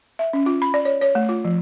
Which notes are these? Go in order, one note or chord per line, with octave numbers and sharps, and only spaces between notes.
E5
C#4
F4
B5
D5
C#5
C#5
A3
F4
F3